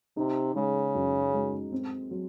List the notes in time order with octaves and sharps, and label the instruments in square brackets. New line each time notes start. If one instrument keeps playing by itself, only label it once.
[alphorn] C3 [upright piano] D#4
[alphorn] C#3 [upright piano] G#3
[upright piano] F#2
G#3
C4
F#3